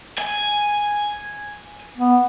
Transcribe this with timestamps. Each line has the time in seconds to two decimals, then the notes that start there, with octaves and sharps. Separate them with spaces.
0.18 G#5
1.98 B3